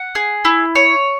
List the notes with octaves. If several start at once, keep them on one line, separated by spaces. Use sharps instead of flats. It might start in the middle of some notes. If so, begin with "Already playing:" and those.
Already playing: F#5
G#4
E4
C#5